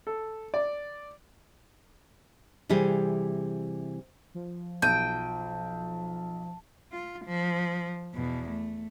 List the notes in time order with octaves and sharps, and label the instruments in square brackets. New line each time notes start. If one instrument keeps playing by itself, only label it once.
[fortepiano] A4
D5
[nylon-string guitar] C3 E3 G3 G4 G#4
[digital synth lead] F3
[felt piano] B1 D#7 [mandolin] G5 [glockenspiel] A5
[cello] F4
F3
E2 B2
A3